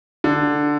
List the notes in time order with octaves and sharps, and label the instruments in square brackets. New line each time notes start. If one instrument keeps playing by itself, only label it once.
[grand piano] D3